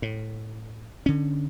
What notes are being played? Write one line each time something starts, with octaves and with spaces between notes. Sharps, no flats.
A2
D3 C#4